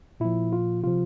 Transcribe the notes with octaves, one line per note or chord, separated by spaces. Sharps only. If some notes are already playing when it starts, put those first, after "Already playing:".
A#2 F3 E4
F4
C3 F3 F4